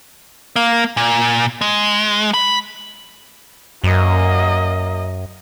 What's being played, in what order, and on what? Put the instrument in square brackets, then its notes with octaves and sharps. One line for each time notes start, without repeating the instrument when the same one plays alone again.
[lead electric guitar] A#3
A#2
G#3
B5
[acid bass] F#2 [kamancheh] A#3 D#5